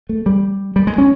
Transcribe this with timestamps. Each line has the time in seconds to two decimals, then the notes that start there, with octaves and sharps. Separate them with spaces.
0.09 A3
0.26 G3
0.76 G3
0.87 G#3
0.98 C#4